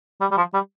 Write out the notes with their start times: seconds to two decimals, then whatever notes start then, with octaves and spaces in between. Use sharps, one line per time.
0.21 G3
0.31 G3
0.37 F3
0.54 G3